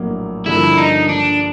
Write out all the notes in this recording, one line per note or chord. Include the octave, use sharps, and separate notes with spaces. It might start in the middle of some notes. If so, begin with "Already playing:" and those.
Already playing: A#1 A2 F#3 A#3
G2 D3 F3 A#3 E4
D#4
D4